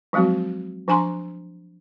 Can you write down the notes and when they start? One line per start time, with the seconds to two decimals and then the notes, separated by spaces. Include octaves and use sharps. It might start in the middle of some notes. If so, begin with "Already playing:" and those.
0.13 F3 F#3 G#3 C4 F#4
0.88 F3 D4 G#5 A#5 C6